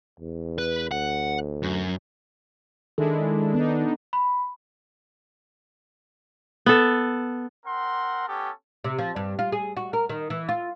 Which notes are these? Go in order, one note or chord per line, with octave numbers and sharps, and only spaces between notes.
E2
B4
D2 F#5
F#2
D#3 G#3 D4 E4 A4
B3 D4 D#4
B5
B3 A4
C4 A#4 F#5 C6
B3 C#4 G4 A4
C3
F3
G2
F4
G#4
F#4
A#4
D#3
E3
F4